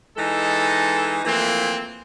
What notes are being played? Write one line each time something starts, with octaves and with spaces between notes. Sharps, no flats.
E3 G#3 D#4 A4
E3 F3 A3 A#3 C4